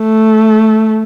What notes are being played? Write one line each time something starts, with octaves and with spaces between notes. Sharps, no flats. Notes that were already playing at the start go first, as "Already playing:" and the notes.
Already playing: A3